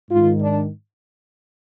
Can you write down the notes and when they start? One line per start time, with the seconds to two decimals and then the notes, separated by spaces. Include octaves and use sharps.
0.10 G#2 D#3 F4
0.40 D4